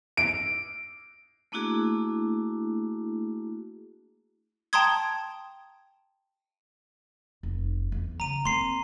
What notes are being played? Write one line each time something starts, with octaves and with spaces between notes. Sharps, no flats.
D7
A3 A#3 D4 E4 F#4 G#4
G5 A5 A#5 C6 D#6 G#6
F1
E2
C#3 A#5 D#7
A#3 C4 C6 C7